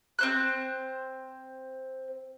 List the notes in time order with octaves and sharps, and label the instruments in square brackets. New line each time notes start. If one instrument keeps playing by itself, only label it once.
[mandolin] C4 C5 F#6